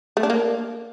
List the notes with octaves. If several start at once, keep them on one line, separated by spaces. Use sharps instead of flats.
A3
D4
A#3